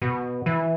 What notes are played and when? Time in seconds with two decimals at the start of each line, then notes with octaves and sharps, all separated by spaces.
0.02 B2
0.46 E3